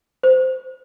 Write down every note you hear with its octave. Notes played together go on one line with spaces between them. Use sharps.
C5